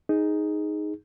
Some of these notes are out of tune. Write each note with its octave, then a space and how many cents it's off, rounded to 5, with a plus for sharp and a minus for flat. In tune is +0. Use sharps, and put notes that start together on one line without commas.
D#4 +0 G#4 +0